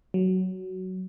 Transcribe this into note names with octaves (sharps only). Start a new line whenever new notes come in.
F#3